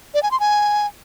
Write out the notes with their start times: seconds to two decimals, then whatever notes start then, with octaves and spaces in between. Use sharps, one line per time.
0.14 D5
0.23 G#5
0.31 C6
0.40 G#5